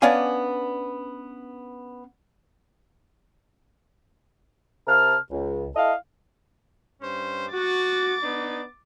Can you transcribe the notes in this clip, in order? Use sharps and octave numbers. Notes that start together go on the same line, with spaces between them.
B3 C#4 D4 D5 F5 G#5
C3 A#4 A5 F6
C#2
E4 A4 D#5 F5
G2 C#4 C5
F#4 D6 A6
B3 D4 D#4